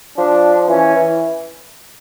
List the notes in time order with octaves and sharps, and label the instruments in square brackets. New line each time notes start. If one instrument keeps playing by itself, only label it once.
[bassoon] F3 [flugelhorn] D4
[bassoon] E3 [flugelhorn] C#4
[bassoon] E3